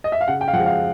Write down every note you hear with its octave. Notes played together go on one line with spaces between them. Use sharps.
D#5
E5
F5
C#3 F#5
G5
F5
F3 G#3 F#5
F5